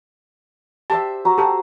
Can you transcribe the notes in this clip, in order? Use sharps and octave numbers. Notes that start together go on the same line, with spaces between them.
G4 C5 E5 A5
F#4 A#5 D6
G4 A4